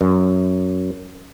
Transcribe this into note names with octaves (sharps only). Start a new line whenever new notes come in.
F#2